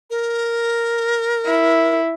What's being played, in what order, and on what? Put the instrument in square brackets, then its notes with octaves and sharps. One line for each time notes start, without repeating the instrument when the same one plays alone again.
[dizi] A#4
[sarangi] E4